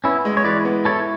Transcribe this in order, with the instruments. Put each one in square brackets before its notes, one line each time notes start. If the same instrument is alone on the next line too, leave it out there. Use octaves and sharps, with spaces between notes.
[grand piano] B3 [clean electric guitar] C#4 E4
[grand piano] G#3
[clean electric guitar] C#5
[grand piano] E3 [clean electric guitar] B4 D5
[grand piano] B3
[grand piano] E4 [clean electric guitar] A4 C#5